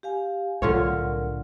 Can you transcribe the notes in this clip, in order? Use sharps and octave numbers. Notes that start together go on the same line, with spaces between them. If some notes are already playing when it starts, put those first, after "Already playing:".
G4 F5 G#5
C2 A2 D3 F#3 F4 A#4 C#5